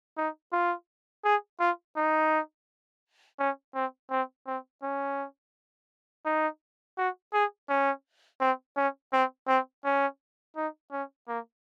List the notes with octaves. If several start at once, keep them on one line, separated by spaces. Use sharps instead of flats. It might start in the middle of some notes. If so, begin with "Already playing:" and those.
D#4
F4
G#4
F4
D#4
C#4
C4
C4
C4
C#4
D#4
F#4
G#4
C#4
C4
C#4
C4
C4
C#4
D#4
C#4
A#3